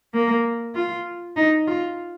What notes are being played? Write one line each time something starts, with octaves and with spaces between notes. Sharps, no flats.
A#3
F4
D#4
F4